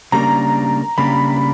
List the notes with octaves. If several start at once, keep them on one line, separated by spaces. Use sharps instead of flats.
C#3 G3 A#3 D4 A#5
C#3 G3 A#3 D4 B5